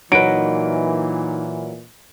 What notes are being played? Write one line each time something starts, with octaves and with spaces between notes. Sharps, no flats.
A#2 E3 F#3 D#4 A#4 B4 D#5 D7